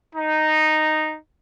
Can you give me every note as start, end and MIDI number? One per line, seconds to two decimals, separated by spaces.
0.15 1.16 63